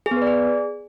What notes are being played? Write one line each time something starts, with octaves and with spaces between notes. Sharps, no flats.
G#4
B3
B4
D5
G#4